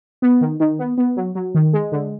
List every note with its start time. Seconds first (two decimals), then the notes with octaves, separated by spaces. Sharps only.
0.22 B3
0.41 D#3
0.60 D#3
0.79 B3
0.98 B3
1.17 F#3
1.35 F#3
1.55 D#3
1.73 G#3
1.92 D3